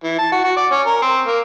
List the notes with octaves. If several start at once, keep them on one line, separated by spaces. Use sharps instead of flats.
E3
A5
F#4
F#4
D5
C#4
A#4
C4
A#3